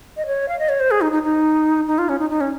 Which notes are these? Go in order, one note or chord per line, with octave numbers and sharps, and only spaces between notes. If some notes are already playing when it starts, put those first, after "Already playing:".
D#5
C#5
F5
D#5
C#5
C5
G#4
D#4
D#4
D#4
D#4
F4
C#4
D#4
D#4
C#4